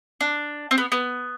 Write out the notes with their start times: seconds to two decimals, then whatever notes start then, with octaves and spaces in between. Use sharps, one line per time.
0.21 D4
0.71 C4
0.78 B3
0.92 B3